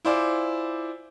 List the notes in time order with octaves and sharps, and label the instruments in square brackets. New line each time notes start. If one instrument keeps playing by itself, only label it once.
[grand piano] E4 F4 C5 D5 G#5 D6